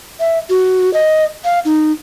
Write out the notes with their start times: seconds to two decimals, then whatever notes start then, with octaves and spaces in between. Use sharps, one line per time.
0.20 E5
0.50 F#4
0.94 D#5
1.44 F5
1.65 D#4